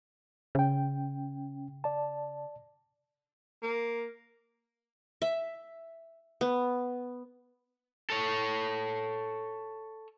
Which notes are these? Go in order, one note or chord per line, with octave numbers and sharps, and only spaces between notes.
C#3 C#4 G5
D5 A5
A#3
E5
B3
A4 C#5